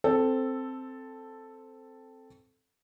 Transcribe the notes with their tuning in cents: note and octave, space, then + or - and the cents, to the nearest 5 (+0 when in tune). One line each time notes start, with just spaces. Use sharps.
C4 +0 A4 +0 C5 -5